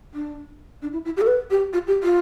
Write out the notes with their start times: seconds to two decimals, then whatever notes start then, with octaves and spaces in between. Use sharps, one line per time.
0.14 D4
0.82 D4
0.93 E4
1.05 E4
1.17 G4
1.21 A4
1.27 B4
1.51 G4
1.73 F4
1.87 G4
2.03 F4